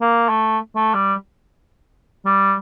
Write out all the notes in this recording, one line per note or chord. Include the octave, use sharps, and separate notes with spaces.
A#3
A3
A3
G3
G3